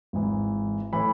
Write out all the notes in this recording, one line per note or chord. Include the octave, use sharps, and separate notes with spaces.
G#1 G#2 E3
A2 E3 B5